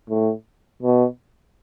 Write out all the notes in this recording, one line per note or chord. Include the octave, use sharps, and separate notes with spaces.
A2
B2